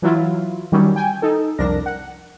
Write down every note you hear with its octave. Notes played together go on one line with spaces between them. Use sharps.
E3 F#3 E4 F4
D#3 F#3 G3 C#4
G5 G#5
D#4 A4
C2 F2 D4 A#4 A#6
F#5